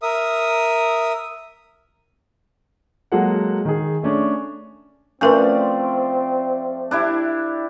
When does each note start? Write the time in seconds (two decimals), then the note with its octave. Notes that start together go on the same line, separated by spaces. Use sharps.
0.03 A#4 E5 D#6
3.12 F#3 G#3 A#3 A4 F#5
3.65 D#3 G#4
4.03 A3 C#4 D4
5.21 F3 A3 C4 C#4 A#4 B4 D5
6.91 D4 E4 G4